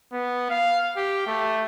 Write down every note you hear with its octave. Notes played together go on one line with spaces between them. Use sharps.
B3
F5
G4
A3